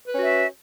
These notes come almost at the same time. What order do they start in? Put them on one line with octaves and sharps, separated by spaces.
B4 C#4 F#4 E5